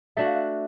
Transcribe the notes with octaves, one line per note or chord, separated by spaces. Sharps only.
A3 D4 F#4 E5
F5
E5